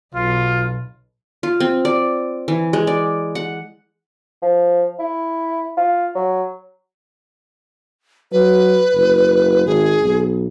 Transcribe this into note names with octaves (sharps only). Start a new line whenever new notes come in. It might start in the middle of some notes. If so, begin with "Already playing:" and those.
B1 F4
F4
C4
D5
E3
G#3
D5
F#5
F3
E4
F4
F#3
F#3 B4
F#1
G#1 G#4
B1